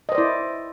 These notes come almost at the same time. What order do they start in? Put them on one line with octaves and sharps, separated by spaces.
D#5 C5 D5 E4